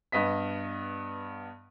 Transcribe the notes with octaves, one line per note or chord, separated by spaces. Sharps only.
G2 B3 D#5 B6